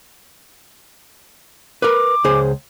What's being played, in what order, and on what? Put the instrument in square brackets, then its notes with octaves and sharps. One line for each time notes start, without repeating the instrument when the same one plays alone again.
[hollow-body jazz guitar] A#4 B4 [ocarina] D6
[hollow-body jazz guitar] C#2 G#4 C5